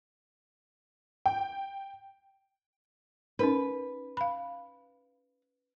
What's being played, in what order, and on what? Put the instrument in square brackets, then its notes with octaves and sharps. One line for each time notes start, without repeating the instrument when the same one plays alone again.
[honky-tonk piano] G5
[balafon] C#4 D#4 A#4 [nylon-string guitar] B4
[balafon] F5 B5